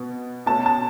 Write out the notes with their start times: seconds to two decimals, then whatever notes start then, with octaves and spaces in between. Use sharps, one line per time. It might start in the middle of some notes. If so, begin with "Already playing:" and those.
Already playing: B2 B3
0.46 B2 A3 C#4 A5
0.66 A5